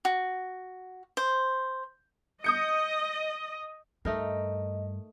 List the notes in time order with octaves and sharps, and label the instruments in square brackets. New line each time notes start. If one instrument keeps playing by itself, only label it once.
[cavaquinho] F#4
C5
[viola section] D#5 [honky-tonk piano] D#6 G6 C#7
[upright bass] G2 [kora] A3 D#4 A#4 [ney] D#5